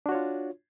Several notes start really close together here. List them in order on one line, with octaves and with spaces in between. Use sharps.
D4 F#4 C#5 F4